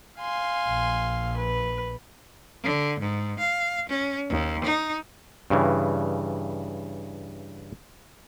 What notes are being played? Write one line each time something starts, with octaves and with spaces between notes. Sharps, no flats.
F5 G#5 C6
A#1
B4
D3
G#2
F5
C#4
D#2
D#4
G2 C#3 E3